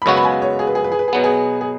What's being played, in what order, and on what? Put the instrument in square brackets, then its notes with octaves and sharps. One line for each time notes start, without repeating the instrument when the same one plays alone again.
[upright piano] B5
[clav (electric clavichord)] F#2 C#3 G#3 B3 F#4 [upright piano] C#6
[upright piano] B5
G#5
C#5
G#4
B4
G#4
B4
G#4
B4
G#4
[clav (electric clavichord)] B2 F#3 B3 [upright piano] B4
[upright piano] G#4
G#4